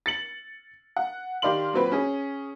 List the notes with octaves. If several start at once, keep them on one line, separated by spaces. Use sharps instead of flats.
A6 C#7 F#7
F#5
D#3 G4 D5 F5 C6 F#7
A#2 F#3 C4 B4
C#4 G#4